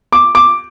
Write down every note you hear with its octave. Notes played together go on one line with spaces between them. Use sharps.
D6
D6